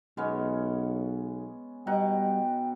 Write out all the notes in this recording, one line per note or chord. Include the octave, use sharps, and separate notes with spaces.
B1 G#3 B3 C#4
B2 G3 D#4 F#5 G5